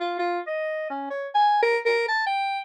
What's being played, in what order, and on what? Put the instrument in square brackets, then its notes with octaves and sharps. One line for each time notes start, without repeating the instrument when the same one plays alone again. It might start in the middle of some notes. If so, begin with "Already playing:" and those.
[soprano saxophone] F4
F4
D#5
C#4
C#5
G#5
A#4
A#4
A5
G5